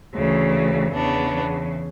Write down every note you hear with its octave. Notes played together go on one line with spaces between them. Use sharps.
D2 C#3 E3
E2 C#3 E3 B3 D4